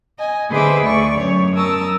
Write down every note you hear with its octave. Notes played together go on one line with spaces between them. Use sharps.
D#5 G#5
D3 G#4 B4 C5 E5 D6
D2 D5 C#6
F#2 C#5
A#4 A5 D#6 E6